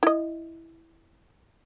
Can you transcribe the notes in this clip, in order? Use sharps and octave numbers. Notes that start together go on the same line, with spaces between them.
E4 D#5